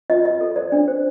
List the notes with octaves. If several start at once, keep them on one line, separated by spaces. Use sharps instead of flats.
F4 D#5
F4 D#5
A4
C5 D5
D4
C5